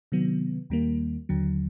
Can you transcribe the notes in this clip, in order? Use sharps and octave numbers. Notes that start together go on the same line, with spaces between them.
C3 D#3 F#3 B3
D#2 D#3 G3 A#3
D#2 D3 F#3